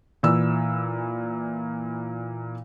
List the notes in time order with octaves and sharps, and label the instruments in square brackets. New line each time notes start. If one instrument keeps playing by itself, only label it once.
[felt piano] A#2 E3 D5 E6